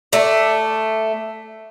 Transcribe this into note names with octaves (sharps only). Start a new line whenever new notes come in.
A3 D5